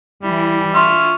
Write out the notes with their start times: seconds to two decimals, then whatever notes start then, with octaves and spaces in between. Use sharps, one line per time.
0.23 E3 G3 E4
0.75 F4 E5 C6 C#6 F6